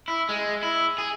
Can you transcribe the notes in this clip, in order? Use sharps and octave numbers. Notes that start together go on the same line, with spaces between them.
E4
G#3
E4
G#4